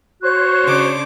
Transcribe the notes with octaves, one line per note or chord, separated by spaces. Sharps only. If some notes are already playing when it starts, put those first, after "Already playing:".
F#4 C5 C#5 F#6
C#3 D4 D6